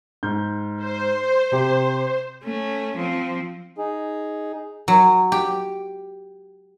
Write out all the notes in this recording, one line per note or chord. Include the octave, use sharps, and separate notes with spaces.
G#2 F6 G6
C5
C3 G4
A3 C#4
F3 C4
D#4 G#4
F#3
G4